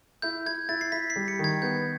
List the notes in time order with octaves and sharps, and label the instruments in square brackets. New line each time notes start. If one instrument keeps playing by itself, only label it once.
[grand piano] E4 [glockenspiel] G6
[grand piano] E4 [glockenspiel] G#6
[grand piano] E4 [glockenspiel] A6
[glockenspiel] C7
[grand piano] E4 [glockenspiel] B6
[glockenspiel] C7
[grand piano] G3
[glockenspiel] C#7
[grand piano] D#3
[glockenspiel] G#6
[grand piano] B3 [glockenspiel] G6